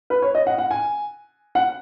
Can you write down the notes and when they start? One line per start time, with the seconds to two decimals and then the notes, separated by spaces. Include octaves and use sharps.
0.10 B4
0.22 C#5
0.35 D#5
0.47 F#5
0.58 F#5
0.71 G#5
1.55 F#5